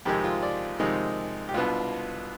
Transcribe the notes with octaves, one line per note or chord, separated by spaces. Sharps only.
F2 C3 D#3 G#3 G4
F4
D5
F2 C3 D#3 G#3 D#4
G4
C2 B2 B3 D4 F4